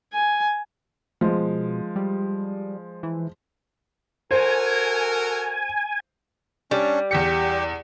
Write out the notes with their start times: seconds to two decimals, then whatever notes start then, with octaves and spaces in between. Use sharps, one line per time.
0.14 G#5
1.21 B2 F3 G#3
1.96 G3
3.03 E3
4.31 F#4 A4 A#4 C5 G#5
6.71 G3 C#4 D4
7.11 E2 G4 B6 C#7